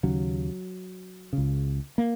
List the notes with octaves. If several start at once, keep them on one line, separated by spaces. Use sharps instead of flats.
D#2 C#3 F#3
C#3
C#2
A#3